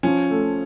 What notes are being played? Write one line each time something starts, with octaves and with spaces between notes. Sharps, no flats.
F3 C#4
A3